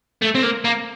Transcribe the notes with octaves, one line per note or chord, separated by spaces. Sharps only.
A3
C4
A#3
A#3